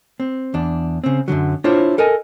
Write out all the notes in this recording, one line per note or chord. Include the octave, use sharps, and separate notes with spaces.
C4
E2 D4
C#3 C4
F#2 A#2 D3 F#3
D4 E4 F4 C5 C#5
A4 A#4 D#5 G#5